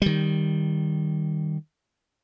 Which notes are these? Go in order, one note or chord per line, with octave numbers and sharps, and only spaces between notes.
D#3 G3